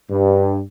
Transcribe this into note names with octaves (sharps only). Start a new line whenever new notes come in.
G2